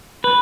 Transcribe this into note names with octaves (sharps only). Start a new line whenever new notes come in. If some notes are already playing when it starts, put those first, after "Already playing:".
B4